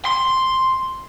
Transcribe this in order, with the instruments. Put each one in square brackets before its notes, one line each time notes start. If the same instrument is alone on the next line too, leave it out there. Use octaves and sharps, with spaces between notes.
[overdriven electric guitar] C6